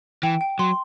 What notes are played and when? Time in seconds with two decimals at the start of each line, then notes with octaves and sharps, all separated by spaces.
0.23 E3 G5
0.41 G5
0.59 F#3 C6